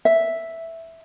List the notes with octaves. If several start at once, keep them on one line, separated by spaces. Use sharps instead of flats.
E5